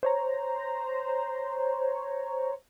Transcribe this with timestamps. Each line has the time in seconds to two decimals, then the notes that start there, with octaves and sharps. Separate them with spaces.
0.03 C5 C#5 A#5